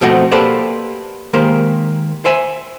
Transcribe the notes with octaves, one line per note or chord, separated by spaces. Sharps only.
B2 F3 A3 C4 F#4 D#5
A#3 G4 A4 B4 C5 D5
D#3 G#3 A#3 G4 C5
C5 E5 G#5